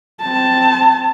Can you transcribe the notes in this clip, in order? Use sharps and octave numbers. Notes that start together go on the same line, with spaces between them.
C4 A5